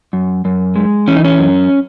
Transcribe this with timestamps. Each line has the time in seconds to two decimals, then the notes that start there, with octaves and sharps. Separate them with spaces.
0.13 F#2
0.45 F#2
0.76 G#3
1.08 E3 C#4
1.15 D#4
1.25 C#4
1.39 F#2